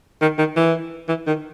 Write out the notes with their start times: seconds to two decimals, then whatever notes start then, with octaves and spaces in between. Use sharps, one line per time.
0.22 D#3
0.39 D#3
0.57 E3
1.09 E3
1.27 D#3